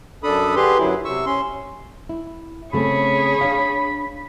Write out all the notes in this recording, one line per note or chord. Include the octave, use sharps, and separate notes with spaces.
F#2 D4 A4 B5 D#6
D3 G4 G#4 B4 C6
F#2 F#3 E4
C3 C#6 E6
C#4 C6
E4
C#3 A3 C4 G#4 C#5 B5
D4 F5